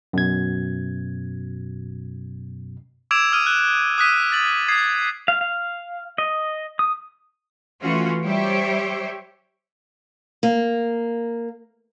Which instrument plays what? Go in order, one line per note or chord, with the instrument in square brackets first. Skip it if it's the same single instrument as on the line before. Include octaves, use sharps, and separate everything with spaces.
[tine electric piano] F#2 B2 G#6
[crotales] D6 E6 G#6 D7 E7 F7
D#6 F6 D#7
F#6
D#6 F#6 B6 D#7
A6 F#7
D#6 G#6 C7
[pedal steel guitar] F5
F5
D#5
D#6
[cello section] E3 A3 C#4 F4 F#4
G3 G4 C5 C#5 E5
[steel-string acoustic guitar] A#3